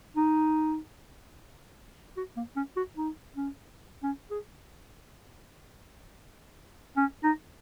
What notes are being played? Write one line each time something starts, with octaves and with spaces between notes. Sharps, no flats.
D#4
F#4
A#3
C#4
F#4
D#4
C#4
C#4
G#4
C#4
D#4